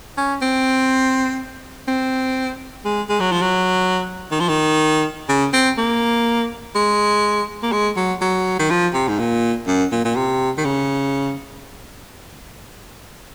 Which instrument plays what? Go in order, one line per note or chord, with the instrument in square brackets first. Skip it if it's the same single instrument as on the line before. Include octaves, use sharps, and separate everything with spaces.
[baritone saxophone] C#4
C4
C4
G#3
G#3
F#3
F3
F#3
D#3
F3
D#3
C#3
C4
A#3
G#3
A#3
G#3
F#3
F#3
D#3
F3
C3
G#2
A#2
F#2
A#2
A#2
C3
D#3
C#3